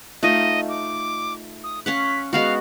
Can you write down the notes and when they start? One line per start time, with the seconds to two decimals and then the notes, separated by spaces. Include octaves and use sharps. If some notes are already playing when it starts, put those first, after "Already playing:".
0.23 A3 D#4 F4 D#5
0.69 D6
1.64 D#6
1.86 C#4 F5 F#5 B6
2.33 G#3 B3 F#4 F5